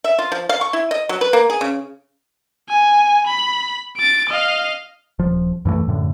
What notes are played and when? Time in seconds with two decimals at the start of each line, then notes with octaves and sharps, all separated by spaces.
0.04 E5
0.19 F4
0.32 F3
0.49 F5
0.61 C#6
0.73 E4
0.91 D#5
1.09 F#3
1.21 B4
1.33 A#3
1.50 G#4
1.61 C#3
2.69 G#5
3.26 B5
3.97 A6 D7
4.29 D#5 F5
5.19 D#1 F3
5.65 F#2 E3 F3 A3
5.87 F#2 A2 D3